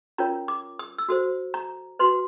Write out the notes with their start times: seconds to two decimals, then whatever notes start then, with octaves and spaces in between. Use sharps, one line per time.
0.18 C#4 F4 A#4 C#5 A#5
0.48 D6
0.79 D#6
0.98 E6
1.09 F#4 A4 C5 D#6
1.54 A#5
1.99 F#4 B4 C6